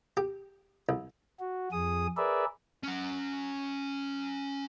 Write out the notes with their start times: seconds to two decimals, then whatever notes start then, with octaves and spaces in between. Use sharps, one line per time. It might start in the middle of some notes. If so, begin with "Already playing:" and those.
0.17 G4
0.89 C2
1.40 F#4
1.72 F2 G#4 D#6
2.17 G#4 A#4 B4 D5 E5
2.84 C#4 F#5